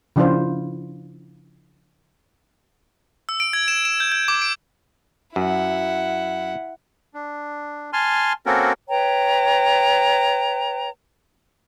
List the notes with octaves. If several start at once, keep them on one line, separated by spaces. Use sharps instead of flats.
C#3 F3 D4 E4 F4 C5
E6
D7
G#6
E7
E7
G6
G6
D6
D7
F#2 E4 F#5
D4
G#5 A5 C6 F6
A#3 C4 C#4 F#4 A4 A#4
B4 C#5 G5 A#5